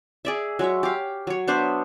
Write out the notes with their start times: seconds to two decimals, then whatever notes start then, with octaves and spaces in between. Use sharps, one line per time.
0.25 G#4 D5 E5
0.59 F#3 G#3 C#5 E5
0.83 G4 F5
1.27 F#3 C#5
1.47 B3 D4 C5 E5